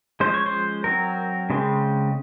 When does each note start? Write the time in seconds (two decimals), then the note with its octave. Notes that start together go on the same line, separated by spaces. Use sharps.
0.20 F3 G#3 C#4 C5
0.34 C#5
0.46 C5
0.84 F#3 C4 A#4
1.50 C#3 G#3 C4